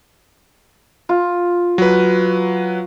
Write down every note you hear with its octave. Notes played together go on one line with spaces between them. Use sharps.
F4
F#3 B4